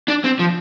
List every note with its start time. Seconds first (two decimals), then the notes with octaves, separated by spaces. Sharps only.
0.08 D4
0.24 C4
0.39 F3